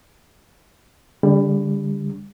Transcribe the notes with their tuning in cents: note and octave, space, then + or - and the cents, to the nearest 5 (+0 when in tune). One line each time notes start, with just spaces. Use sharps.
D3 -20 G3 +30